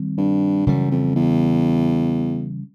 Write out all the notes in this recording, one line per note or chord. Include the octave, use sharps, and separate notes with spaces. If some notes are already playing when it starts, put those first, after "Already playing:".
Already playing: D#3 G3 C4
G2
F#2 C#3 E3 G3
F2
E2